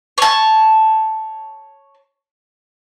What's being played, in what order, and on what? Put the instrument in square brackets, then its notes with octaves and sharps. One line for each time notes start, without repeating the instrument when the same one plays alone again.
[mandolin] C#5 A5